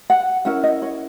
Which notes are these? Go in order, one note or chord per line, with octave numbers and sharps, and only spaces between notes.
F#5
C#4 E4 A#4 F#5
D#5
C#5